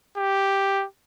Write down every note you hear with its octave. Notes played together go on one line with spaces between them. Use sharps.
G4